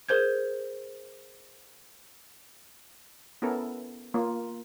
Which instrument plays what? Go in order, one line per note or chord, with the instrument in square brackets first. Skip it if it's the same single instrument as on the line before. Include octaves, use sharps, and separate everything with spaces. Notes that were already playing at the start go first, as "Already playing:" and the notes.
[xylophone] G#4 A#4 C5 G6 G#6
[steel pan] B3 C#4 E4 A4 A#4
A#3 F4